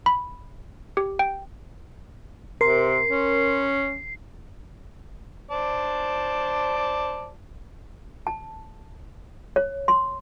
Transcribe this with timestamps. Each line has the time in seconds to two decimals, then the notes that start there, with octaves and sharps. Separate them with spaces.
0.06 B5
0.97 G4
1.19 G5
2.61 C3 A#4 C6 C7
3.10 C#4
5.51 C5 D5 A5
8.27 A5
9.56 C#5
9.88 C6